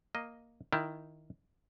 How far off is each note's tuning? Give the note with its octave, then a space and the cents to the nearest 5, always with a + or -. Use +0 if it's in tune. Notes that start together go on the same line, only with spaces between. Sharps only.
A#3 +0 D#5 +0
D#3 +0 E4 +15